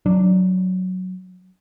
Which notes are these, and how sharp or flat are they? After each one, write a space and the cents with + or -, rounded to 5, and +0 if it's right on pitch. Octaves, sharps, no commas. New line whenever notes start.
F#3 +0 D4 +0